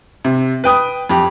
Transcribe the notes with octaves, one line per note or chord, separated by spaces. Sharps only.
C3
B4 G5 D#6
F2 G4